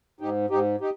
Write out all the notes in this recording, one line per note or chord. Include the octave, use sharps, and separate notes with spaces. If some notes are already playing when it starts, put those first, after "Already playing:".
G#2 D#4 G4
G#2 D#4 G4
D#4 G4